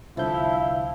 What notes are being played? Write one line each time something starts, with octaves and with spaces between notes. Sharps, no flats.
C2 D3 F3 E4 E5 F5 B5 G6